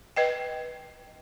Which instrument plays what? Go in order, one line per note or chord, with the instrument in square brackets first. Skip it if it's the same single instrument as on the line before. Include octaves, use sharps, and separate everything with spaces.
[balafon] B4 D#5 G5